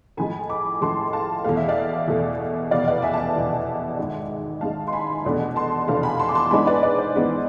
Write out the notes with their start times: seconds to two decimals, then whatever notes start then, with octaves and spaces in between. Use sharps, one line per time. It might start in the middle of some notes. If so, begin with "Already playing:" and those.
0.17 A2 F3 G#3 G#5 B5
0.49 B5 D6
0.81 A2 F3 G#3 A5 C6
1.13 F5 A5
1.44 E2 B2 A3 F5
1.57 E5
1.69 D5 F5
2.08 E2 B2 A3
2.71 F1 E2 B2 D5 F5
2.87 B4 D5
3.02 E5 G#5
3.13 A5
3.18 E5 G#5
3.35 F1 E2 B2
3.98 G#1 G#2 G#3
4.61 G#1 G#2 G#3 F5 A5
4.88 C6
4.93 G#5 B5
5.24 F1 E2 B2 A3 D4
5.56 A5 C6
5.88 F1 E2 B2 A3 D4 F5 A5
6.03 G#5 B5
6.19 A5 C6
6.29 D6
6.35 A5 C6
6.51 G#2 E3 G#3 B3 D4 G#5 B5
6.67 B4 D5
6.83 B4 D5
6.98 C5
7.14 G#2 E3 G#3 B3 D4 B4